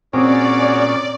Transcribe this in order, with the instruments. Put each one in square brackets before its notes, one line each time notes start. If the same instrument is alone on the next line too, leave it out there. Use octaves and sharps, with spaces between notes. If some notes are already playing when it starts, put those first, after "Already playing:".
[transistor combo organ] A#2 C#4 D6 [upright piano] C4 [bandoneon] F#4 G#4 C#5 [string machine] D5